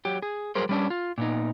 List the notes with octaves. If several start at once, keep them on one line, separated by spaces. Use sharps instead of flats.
F#3 G4
G#4
F#3 G3 G#4 A#4 C5
G3 C#4 D4
F4
A#2 B3 D#4